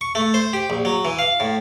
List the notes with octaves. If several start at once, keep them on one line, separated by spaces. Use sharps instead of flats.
C#6
A3
C5
G4
A#1
F#3
E3
F5
A2